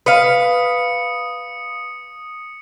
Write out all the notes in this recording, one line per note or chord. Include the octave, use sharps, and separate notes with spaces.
B4 F5 D#6 C#7